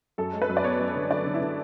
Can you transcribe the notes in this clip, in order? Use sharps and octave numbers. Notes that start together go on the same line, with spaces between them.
F#2 A4
G#3
B4
F#2
D5
B3 C#5
F#2
D3
D3 D5
D3
E4
D3